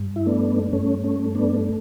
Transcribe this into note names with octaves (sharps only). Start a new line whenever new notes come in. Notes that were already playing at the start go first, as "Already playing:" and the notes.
Already playing: G2
E4
A3 B3 D4
G2 A3 C#4
A3 C#4
A3
B3 D4